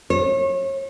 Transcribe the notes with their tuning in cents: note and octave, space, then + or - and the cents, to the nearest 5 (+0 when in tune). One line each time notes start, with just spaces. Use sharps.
C#5 -35